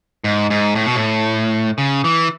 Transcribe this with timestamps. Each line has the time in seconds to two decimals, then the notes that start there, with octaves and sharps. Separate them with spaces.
0.24 G#2
0.50 G#2
0.75 A2
0.86 B2
0.95 A2
1.78 C#3
2.04 E3